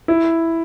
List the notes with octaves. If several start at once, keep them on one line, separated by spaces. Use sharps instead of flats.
E4